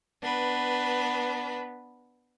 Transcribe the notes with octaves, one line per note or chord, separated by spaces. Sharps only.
B3 D4 B4